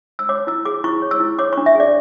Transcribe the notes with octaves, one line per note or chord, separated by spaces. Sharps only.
E6
C#5 D6
E4 E6
G#4 D6
E4 C#6
C#5
E6
E4
C#5 D6
C#6
D4
E5
G#4 D5